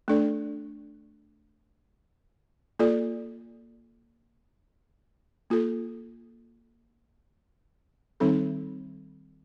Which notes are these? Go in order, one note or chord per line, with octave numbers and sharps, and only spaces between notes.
A3 D4 A4 D5
A#3 F4 A4 D5
A#3 F4 A4
D#3 G3 C4 D#4 A4